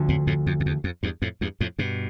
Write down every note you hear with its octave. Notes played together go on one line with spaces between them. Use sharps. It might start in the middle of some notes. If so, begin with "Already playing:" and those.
Already playing: D2 D3 F3
F2 A2
F2 A2
F2
F2
E2
F2
E2 G2
F2 A2
E2 G2
F2 A2
G2 B2